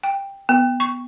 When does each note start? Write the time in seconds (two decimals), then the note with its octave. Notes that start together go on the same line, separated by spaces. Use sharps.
0.04 G5
0.49 B3
0.80 C#6